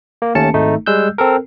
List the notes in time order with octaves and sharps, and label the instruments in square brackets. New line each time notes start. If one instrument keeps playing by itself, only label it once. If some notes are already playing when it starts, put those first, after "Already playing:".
[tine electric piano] A#3
D#2 A3 C#4 A5 C#7
G#1 A3 D#4
G3 G#3 E6 F#6 G6
C4 A4 A#4